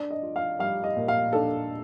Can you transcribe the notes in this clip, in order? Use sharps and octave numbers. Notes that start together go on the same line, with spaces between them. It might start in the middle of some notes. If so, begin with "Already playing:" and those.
Already playing: D4 D5
D#5
F4
F5
G3 F5
D#5
A#2
F5
D4 A4